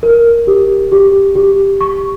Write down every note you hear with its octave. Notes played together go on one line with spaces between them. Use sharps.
A#4
G4
G4
G4
C#6